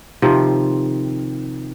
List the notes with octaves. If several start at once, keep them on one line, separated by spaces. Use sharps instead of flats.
C3 D#3 F3 C4